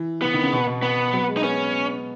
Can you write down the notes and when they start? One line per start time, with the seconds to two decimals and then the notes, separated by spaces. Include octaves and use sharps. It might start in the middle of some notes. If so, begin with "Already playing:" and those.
Already playing: E3
0.22 E3 B3
0.34 D#3
0.43 C#3
0.52 B2
0.67 B2
0.82 B3
1.13 F#3
1.28 G#3
1.37 D#4
1.43 B3 C#4